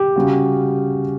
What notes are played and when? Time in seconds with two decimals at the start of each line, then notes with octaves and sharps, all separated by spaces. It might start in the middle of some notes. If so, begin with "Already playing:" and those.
Already playing: G4
0.16 C#3 G3 C#4 F#4